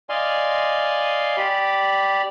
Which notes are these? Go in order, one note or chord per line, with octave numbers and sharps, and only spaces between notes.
D5 D#5 F5 G#5 C6
G4 D5 B5